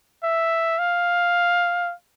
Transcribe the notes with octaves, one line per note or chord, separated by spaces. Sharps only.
E5
F5